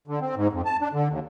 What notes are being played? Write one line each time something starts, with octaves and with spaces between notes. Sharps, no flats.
D3
C4
G#2
F2
A5
D4
D3
D#2